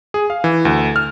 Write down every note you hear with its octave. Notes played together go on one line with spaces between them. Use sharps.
G#4
F5
E3
D2
F6